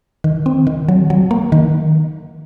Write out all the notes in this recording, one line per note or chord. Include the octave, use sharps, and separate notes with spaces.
D#3
C4
D#3
F#3
F#3
A#3
D#3